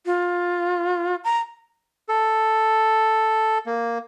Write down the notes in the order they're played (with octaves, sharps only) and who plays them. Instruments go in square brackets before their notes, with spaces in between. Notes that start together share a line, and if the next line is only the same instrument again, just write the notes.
[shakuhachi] F4
A#5
[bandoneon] A4
A#3